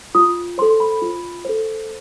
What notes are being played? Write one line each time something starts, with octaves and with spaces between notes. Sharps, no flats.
F4 D#6
A4 C5 C6
B5
F4
A4 C5